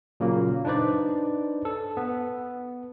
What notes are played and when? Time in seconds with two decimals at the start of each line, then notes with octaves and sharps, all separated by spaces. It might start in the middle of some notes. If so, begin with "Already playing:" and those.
0.20 A#2 C#3 F#3 A#3
0.65 D4 D#4 B4 C5 D5
1.65 A4
1.97 B3